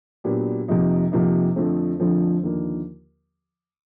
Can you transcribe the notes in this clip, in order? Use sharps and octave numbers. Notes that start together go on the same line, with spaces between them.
A#2 F#3 B3 D4 G4
F2 C3 F3 A#3 D#4
F2 C3 F3 A#3 D#4
F2 D3 F3 A3 C4
F2 D3 F3 A3 C4
D#2 D3 F3 A#3